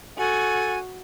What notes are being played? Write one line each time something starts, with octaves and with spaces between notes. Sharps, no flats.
F#4 A4 G#5